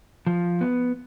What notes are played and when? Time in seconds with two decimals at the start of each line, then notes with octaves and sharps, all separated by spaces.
0.27 F3
0.61 B3